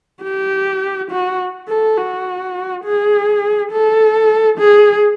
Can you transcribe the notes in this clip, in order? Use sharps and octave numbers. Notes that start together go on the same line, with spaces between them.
G4
F#4
A4
F#4
G#4
A4
G#4